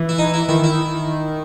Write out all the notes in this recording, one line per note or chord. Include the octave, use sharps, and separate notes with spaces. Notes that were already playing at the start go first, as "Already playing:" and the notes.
Already playing: E3
E4
D#4
E4
D#3 E4
E4